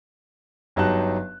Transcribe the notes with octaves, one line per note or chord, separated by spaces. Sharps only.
G1 F#3 D#4 G4 A5 F#6